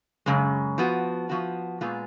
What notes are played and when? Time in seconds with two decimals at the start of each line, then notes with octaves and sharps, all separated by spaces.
0.26 F#2 C#3 G#3
0.78 F3 B3 F#4
1.30 F3 B3 F#4
1.81 A#2 G#3 B3 F4